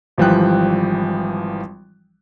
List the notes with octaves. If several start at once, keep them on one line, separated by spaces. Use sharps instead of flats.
G#1 E3 F3 G3 G5 F#6